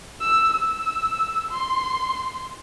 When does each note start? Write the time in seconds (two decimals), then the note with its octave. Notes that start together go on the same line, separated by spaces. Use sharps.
0.21 E6
0.54 E6
1.51 C6